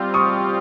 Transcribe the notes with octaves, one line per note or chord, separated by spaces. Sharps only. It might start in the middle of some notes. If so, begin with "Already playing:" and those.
Already playing: G3 C4 F4
C#6 D#6